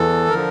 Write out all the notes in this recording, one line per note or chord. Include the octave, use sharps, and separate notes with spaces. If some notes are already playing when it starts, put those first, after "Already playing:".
Already playing: E2 E3 A4
D3 F3 A#4